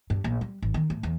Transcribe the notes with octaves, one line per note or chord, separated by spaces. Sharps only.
G2
A#1
G3
G#1
D#3
A2
E2